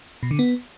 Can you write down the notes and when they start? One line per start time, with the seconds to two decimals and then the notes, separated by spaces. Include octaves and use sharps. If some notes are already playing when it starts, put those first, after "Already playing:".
0.23 B2
0.31 D3
0.39 B3